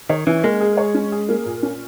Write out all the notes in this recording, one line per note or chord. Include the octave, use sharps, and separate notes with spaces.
D#3 C#5
E3 C#4
G#3 A#3
G#4
C#5
C#4
G#4
A#3
A#2
C#4